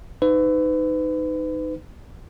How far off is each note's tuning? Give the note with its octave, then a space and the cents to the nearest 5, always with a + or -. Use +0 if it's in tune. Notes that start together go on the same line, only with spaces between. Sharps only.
D#4 +0 B4 +35